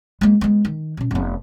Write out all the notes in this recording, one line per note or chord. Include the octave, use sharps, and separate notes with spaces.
G#3 A#3
G#3 B3
D#3
B2 C#4
F1 B3